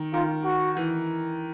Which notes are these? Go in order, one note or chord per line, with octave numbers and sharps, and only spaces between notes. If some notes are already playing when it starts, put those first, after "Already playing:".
Already playing: D#3
D#3 F4
F#4
E3